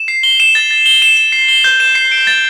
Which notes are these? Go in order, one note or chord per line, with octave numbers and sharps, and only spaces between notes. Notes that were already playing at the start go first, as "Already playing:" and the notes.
Already playing: E7
C7
G7
E7
A6
A6
G7
E7
E7
C7
G7
G6
E7
C7
D7
A6